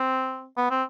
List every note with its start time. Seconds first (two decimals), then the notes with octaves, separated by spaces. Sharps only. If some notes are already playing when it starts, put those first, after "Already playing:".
Already playing: C4
0.57 B3
0.71 C4